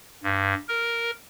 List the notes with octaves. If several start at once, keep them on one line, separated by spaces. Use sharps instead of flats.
G2
A#4